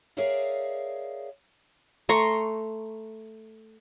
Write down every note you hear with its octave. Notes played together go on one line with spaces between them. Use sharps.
G#4 A#4 C#5 D5 E5 F5
A3 A#5 C6 C#6